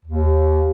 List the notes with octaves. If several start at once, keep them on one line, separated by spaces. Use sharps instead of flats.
D#2